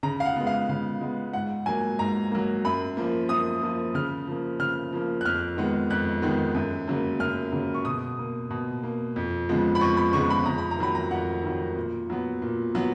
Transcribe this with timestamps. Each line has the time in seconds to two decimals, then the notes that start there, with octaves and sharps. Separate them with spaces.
0.03 C#3 A#5
0.20 F5
0.26 F#5
0.36 G#3 B3
0.47 F5
0.69 C#3 F5
1.01 G#3 B3
1.33 G#2 F#5
1.66 F#3 A#3 G#5
1.99 G#2 A#5
2.32 F#3 A#3
2.65 F#2 B5
2.97 F3 A#3
3.29 F#2 D#6
3.62 F3 A#3
3.94 C#3 F6
4.27 F3 A#3
4.59 C#3 F6
4.93 F3 A#3
5.21 F#6
5.25 F2 F6
5.57 D#3 G#3 B3
5.90 F2 F#6
6.22 D#3 G#3 B3
6.55 F#2
6.88 C#3 F#3 A#3
7.20 F#2 F6
7.52 C#3 F#3 A#3
7.74 C#6
7.85 B2 D#6
8.19 A#3
8.50 B2
8.83 A#3
9.16 F2
9.49 C#3 F3 G#3 B3
9.75 B5
9.81 F2 C#6
9.97 B5
10.13 C#3 F3 G#3 B3 C#6
10.30 B5
10.46 F2 A#5
10.58 B5
10.71 A#5
10.78 D#3 F#3 B5
10.95 A#5
11.11 F2 F#5
11.43 D#3 F#3
11.77 A#2
12.10 F#3 B3
12.42 A#2
12.75 F#3 B3